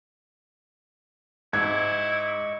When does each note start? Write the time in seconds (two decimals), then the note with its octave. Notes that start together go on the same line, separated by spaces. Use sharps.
1.53 G#2 E4 D#5 C#6 G#6